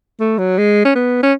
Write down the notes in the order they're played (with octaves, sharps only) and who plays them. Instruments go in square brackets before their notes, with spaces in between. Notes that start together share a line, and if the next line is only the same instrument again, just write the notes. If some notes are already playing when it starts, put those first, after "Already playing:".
[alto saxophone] A3
F#3
G#3
C#4
B3
C#4